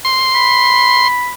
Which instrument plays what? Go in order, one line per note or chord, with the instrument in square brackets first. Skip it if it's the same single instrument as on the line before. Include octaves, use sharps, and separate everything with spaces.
[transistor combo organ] C6
[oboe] B5